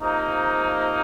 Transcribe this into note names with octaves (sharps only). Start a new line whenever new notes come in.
C3 F3 A#3 D#4